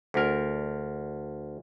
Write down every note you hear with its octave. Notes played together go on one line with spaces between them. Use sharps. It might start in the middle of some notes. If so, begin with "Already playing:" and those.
D2 A#4